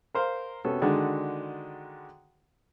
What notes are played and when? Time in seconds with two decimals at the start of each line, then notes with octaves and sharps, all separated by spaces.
0.15 A#4 C5 F5
0.65 C3 B3 C#4 F#4 A4
0.82 D3 D#3 G#3 D4 F#4